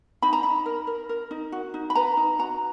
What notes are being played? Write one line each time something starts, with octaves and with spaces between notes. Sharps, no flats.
D#4 B5
A#5
D#4 B5
A#4
A#4
A#4
D#4
F#4
D#4
B5
B4 A#5
D#4
F#4 A#5